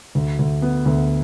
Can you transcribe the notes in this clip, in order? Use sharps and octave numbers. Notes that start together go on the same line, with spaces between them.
D2
D2
B3
D2